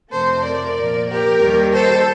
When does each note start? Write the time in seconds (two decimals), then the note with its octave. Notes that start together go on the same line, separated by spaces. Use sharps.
0.12 F2 C3 F3 A3 A4 C5
0.44 A#4 D5
0.76 A#2 F3 A#3
1.09 G4 A#4
1.41 D#2 D#3 G3
1.73 A4 C5